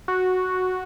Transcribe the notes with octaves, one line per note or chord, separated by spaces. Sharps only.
F#4